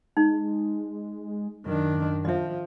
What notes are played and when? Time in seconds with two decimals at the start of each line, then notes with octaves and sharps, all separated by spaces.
0.17 G#3 D#4
1.66 F#2 D#3 D4
2.25 F3 D#5 E5